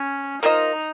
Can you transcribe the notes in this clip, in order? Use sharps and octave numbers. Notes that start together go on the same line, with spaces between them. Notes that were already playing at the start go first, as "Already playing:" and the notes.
Already playing: C#4
A#3 D#4 F4 C5 D#5